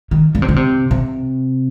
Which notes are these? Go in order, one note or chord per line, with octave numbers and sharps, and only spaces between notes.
D#3
D3
C3
D3
C3
C3